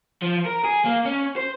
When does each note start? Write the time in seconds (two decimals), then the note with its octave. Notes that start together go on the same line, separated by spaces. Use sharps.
0.22 F3
0.46 A#4
0.64 G#4
0.85 A#3
1.05 C#4
1.36 C5